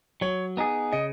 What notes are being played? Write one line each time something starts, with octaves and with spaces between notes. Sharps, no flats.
F#3 C#5
B3 D#4 G#4
C#3 D#5